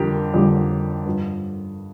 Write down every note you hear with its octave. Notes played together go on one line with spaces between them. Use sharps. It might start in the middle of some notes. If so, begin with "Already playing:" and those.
Already playing: F2 D3 G3 G4 A#4
F2 D3 G3
G2 F3